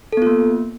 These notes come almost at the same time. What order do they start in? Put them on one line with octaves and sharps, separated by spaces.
A4 B3 F4 A#3